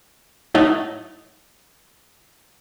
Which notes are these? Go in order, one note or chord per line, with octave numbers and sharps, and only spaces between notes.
A2 F#3 A3 D#4